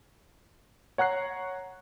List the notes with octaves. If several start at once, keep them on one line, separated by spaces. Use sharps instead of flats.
C#5 F#5 A#5 F#6 C7